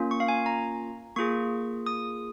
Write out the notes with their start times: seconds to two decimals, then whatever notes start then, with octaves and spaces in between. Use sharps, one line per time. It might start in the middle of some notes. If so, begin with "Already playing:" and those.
Already playing: A#3 C#4 F4
0.11 C#6
0.20 F5
0.28 G#5
0.46 A#5
1.16 A#3 F4 G#4 C#6
1.86 D#6